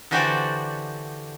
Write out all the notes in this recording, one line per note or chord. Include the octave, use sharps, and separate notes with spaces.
D3 E3 F#4 G4 C5 D5